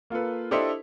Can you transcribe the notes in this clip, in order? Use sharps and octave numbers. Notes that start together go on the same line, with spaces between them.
A#3 F4 A4 B4
D4 E4 G4 A4 C5 D#5